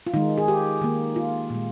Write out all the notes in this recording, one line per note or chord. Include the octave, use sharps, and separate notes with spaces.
F4
D#3 G#3 D#4
G#4
G4
D#3 A#3
F4
A#2 G#3